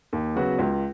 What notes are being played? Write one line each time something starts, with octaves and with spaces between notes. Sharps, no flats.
D#2
C#3 F#3 B3 F#4
C#2